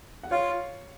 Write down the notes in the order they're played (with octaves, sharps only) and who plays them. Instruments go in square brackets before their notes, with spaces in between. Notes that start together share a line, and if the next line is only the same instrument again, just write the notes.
[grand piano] F#5
[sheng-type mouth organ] F4 [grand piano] C#5 F5